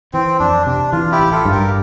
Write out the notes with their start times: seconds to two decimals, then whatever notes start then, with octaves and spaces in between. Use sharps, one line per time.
0.14 E3 C4
0.39 F2 D4
0.66 C3 D4
0.92 E3 F4
1.12 E4 G4
1.19 A1
1.32 F4 A4
1.45 G2
1.51 G4 A#4